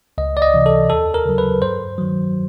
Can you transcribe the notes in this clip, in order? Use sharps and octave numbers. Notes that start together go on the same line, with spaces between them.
C#2 D#5
D5
D#5
C3 E3
A4
D#2 A4
A#4
C#3 F#3
B4
G2 C5
D#3 F#3